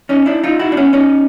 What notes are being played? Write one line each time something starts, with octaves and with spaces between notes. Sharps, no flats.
C#4 D#4
D4 E4
D#4 F4
E4 F#4
D4
B3 C#4
C#4 D#4